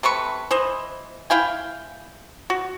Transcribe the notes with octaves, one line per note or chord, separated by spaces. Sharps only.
C3 A3 B4 C#6
E3 C5 D#5
E4 F5 G5 G#5
F#4